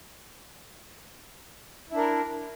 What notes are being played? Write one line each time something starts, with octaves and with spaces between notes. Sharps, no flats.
D4 E4 A#4